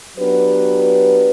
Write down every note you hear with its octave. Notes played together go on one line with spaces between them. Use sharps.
F#3 B3 D4 G4 B4